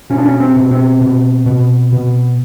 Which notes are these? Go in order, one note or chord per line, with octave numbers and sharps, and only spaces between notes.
B2 C#4
D4
C#4
C4
B2
C4
B2
B2
B2